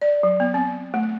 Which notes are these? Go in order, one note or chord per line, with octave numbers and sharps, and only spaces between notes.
D5
F#3
B3
C4
A3